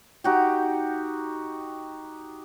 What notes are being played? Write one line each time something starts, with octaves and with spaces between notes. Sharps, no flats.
D#4 F#4 G4